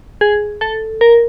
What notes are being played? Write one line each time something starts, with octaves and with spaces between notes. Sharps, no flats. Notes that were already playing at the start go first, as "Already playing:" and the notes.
G#4
A4
A#4